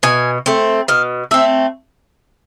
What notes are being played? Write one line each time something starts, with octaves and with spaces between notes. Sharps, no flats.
B2 G#5
A3 C4
B2 F5
A3 C4 E5